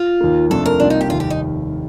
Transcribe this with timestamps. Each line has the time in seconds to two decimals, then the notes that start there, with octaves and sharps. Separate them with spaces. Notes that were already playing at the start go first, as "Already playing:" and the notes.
Already playing: F4
0.21 D#2 D#3 A#3
0.50 F2 C3 F3 A3 D4 A4
0.66 A#4
0.80 C2 C3 D#3 A#3 D4 F4
0.90 D#4
1.01 G4
1.10 F1 D#2 D#3 G3 F4
1.20 G4
1.30 D#4